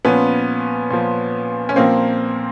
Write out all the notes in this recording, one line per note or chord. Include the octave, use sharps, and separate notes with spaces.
A#2 F3 B3 C#4
A#2 F3
C#4
A#2 F3 A#3 C4